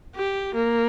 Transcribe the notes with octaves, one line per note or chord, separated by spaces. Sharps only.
G4
A#3